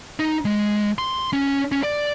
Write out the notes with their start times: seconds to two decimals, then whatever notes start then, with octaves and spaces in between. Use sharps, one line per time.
0.19 D#4
0.45 G#3
0.98 C6
1.33 C#4
1.72 C#4
1.83 D5